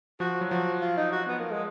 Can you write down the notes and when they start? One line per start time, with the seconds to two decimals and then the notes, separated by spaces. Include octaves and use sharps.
0.20 F3 F#4
0.41 F#3
0.51 F3 F#4
0.82 F4
0.97 D#4
1.12 F#4
1.28 B3
1.39 A#3
1.51 G#3